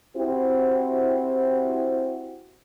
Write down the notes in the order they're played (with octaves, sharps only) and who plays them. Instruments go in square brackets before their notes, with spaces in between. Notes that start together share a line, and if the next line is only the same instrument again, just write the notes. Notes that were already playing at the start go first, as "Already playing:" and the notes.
[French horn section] C4 E4 F#4 G4 C5